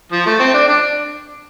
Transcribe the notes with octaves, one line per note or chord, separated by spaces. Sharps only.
F3
A3
C4
D4
D4